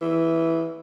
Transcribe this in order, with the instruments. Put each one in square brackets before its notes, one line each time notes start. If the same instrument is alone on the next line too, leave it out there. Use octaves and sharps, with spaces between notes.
[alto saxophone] E3